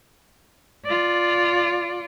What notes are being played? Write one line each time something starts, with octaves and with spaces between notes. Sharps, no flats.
F4 D5